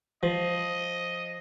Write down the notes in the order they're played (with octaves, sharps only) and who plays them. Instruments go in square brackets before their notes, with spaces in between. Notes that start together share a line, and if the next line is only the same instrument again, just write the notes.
[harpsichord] F3 [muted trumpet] D#5